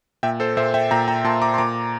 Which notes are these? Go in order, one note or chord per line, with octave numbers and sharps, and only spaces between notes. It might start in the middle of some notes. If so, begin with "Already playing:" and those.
A#2 E5 G5
A4 C5
A#2 C5 E5
E5 G5
A#2 G5 A#5
G5 A#5
A#2 A5 C6
A#5 D6
C6
A#2 A#5 D6